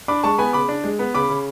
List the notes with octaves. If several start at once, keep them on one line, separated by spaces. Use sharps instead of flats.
D4 B5 D6
G#3 A5 C#6
B3 G#5 B5
C#3 B5 D6
D4
G#3
B3
C#3 B5 D6
C#3